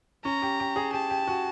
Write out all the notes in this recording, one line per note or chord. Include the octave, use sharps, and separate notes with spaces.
C#4 A#5
G4
G4
G#4
G4 A5
G4
F#4